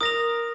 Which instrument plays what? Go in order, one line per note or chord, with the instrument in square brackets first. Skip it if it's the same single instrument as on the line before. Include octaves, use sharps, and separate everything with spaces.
[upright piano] A#4 [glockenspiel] D#6 A#6 F7